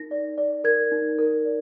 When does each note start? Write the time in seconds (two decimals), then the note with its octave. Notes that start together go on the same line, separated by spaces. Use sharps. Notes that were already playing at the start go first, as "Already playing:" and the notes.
Already playing: D#4 A#4 A#6
0.11 D5
0.38 D5
0.64 A#4 G#6
0.92 D#4
1.19 A#4
1.45 D5